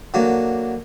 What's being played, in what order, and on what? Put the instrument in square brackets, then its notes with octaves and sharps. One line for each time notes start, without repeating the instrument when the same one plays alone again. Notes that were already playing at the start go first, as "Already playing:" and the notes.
[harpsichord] D3 F#3 A#3